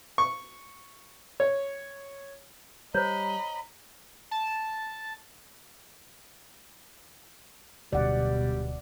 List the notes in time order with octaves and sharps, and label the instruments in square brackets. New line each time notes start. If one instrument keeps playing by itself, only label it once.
[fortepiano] C#6
C#5
[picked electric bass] G3 [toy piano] C5 C#5 [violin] D#5 B5 [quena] A#5
[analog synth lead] A5
[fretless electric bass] D1 D2 [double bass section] B2 [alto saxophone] G3 [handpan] D5 F#5